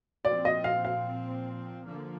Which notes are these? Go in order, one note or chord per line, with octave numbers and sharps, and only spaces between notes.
A#2 F3 C4 D5
D#5
F5
F5
D3 F3 A#3